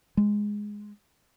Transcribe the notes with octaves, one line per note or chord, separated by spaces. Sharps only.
G#3